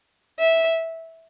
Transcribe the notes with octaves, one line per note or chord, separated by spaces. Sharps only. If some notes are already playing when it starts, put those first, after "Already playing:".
E5